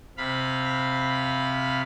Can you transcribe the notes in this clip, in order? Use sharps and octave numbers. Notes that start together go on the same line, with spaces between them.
C3 F5 B5